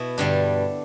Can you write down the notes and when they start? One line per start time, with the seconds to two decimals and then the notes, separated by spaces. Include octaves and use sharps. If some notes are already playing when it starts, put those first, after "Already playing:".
Already playing: B2 E4
0.18 G2 D3 G3 D4